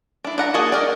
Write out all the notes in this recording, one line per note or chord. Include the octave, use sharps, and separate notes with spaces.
D4 E4
D4 F#5 A#5
A#3 F#4 G#4 D#5 A5
G4 A#4 D5